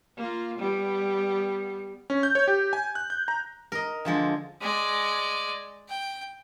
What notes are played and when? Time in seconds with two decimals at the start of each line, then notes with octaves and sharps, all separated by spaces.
0.17 A#3 F4
0.59 G3 B3
2.10 C#4
2.23 G6
2.35 C#5
2.48 G4
2.73 G#5
2.95 F#6
3.10 G6
3.28 A#5
3.72 A#4 D#5
4.05 D3 F3 G#3
4.61 G#3 D5
5.89 G5